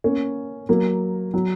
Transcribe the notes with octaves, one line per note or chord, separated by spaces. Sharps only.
A#3 C#4
F#3 A#3
F#3